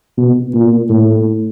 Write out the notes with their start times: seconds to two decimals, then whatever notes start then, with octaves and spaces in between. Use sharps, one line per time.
0.17 B2
0.54 A#2
0.89 A2